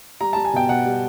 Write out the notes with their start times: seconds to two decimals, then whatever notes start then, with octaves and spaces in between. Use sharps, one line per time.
0.21 G3 A#5
0.33 G3 A5
0.45 G#5
0.53 B2 G5
0.69 B2 F#5
0.86 G3